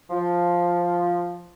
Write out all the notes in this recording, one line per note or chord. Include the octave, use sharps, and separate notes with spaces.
F3